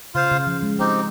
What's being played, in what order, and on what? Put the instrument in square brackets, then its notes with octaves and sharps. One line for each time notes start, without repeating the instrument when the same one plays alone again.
[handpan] C#3 [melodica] F4 C5 F5
[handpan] C#3
F3
G#3
[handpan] G#3 [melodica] C4 D#4 G4